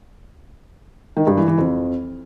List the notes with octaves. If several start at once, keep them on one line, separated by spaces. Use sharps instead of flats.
D#3
G2
E3
E3
F2